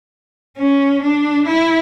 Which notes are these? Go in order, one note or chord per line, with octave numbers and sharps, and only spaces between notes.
C#4
D4
E4